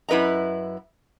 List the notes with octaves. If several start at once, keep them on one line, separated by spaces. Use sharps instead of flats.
F#2 E4 B4 D#5 A#5